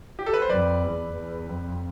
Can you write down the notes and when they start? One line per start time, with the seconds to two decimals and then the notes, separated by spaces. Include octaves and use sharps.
0.19 G4
0.26 A4
0.33 B4
0.42 C5
0.49 F2 B4 D5
0.84 E2
1.16 E2
1.49 F2